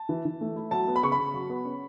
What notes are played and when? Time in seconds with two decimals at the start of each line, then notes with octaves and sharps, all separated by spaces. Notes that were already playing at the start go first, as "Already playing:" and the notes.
Already playing: A5
0.09 E3
0.25 E3
0.41 A3
0.56 E4
0.71 F#3 A5
0.88 B3
0.96 B5
1.03 C#3 C#6
1.12 B5
1.19 C#3
1.34 F#3
1.50 B3
1.65 C#4